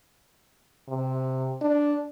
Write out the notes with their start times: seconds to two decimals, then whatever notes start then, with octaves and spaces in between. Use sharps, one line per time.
0.88 C3
1.62 D4